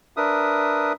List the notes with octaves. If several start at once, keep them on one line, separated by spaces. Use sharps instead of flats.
D4 A#4 B4 E5 D#6